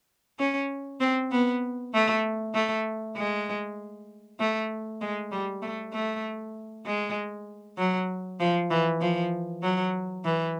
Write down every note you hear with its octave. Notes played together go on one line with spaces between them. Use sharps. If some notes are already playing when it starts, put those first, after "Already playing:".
C#4
C4
B3
A3
A3
G#3
A3
G#3
G3
A3
A3
G#3
F#3
F3
E3
F3
F#3
E3